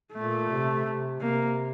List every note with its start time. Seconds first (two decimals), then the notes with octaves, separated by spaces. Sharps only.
0.14 A#2 A3
0.50 C3
0.85 C3
1.21 C3 A#3